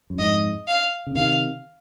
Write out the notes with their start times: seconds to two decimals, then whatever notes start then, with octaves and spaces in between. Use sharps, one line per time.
0.10 F#2
0.18 F2 G#2 D#5
0.68 F5
1.07 C#3
1.15 C3 D#3 F5